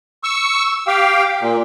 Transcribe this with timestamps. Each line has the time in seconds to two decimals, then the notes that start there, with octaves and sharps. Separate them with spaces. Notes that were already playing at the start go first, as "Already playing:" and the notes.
0.24 C#6 E6
0.87 G4 F5 G5
1.40 A#2